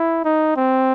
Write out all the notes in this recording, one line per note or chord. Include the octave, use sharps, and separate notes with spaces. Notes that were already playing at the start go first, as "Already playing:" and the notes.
Already playing: E4
D#4
C4